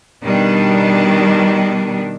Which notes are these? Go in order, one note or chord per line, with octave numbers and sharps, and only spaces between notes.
B2 D#3 G3 D4